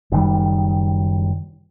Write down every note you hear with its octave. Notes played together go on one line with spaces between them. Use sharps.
F#1 D#3 G3